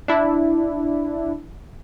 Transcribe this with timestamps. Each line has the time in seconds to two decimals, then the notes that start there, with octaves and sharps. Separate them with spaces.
0.08 D4 E4